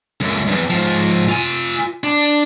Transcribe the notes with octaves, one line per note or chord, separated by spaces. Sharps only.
C#2 F#2
E2 G2
G#2 F3
F4 G#5
D4